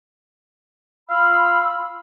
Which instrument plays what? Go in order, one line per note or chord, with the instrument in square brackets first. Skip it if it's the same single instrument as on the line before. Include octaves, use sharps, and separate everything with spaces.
[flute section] F4 B5 E6 [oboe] F5